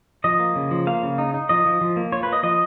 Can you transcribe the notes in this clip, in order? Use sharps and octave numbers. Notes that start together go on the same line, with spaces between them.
F3 D#5
A#3
C#3
F3
A#3 F5
C#3
D#4
D#4
F3 D#5
F3
F3
A#3
F4 C#5
A#3 B4
D#5
F3 D#5